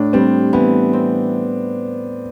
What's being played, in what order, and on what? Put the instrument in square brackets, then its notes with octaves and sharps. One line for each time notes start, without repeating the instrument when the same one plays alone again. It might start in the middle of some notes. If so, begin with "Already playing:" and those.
Already playing: [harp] A2 [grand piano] D4
[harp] G3 [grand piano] C4
[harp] E3 [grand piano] B3
[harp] C4